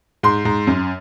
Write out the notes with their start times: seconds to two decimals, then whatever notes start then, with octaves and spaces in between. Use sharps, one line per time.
0.23 G#2 C6
0.45 G#2
0.67 F#2